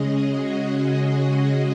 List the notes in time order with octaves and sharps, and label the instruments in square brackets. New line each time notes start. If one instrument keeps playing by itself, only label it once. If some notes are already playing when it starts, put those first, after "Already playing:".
Already playing: [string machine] C#3 G#3 C#4 G#4 D#5
F#4
G#4